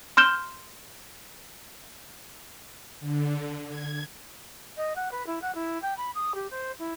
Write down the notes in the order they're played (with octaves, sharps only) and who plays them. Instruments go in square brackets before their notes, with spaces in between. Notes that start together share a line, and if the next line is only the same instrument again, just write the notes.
[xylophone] C6 F6 G6 E7 G7
[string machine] D3
G#6
[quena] D#5
F#5
B4
E4
F#5
E4
G5
B5
D#6
G4
C5
E4